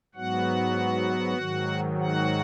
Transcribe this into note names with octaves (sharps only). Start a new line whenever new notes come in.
G#2 F#3 B3 F#4 F#5
G#2 D#3 F#3
F#4 F#5